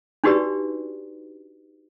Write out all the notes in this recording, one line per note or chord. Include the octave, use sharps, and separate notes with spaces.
D4 D#4 F#4 G4 B4 D5